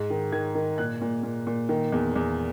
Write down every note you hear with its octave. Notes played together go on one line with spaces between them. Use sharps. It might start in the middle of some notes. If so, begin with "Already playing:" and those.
Already playing: G#2
D#3
D#3 G#6
D#3
A#2 F#6
A#2
A#2
A#2
D#3
E2
E2